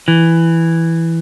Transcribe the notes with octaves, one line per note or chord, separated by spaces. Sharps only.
E3